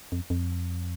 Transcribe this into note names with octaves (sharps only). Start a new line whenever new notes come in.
F2
F2